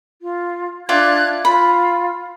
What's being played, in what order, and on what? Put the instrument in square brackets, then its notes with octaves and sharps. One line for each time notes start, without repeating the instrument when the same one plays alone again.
[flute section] F4
[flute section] D4 F#6 G#6 [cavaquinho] F4 D5 E5
[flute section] F4 [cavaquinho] B5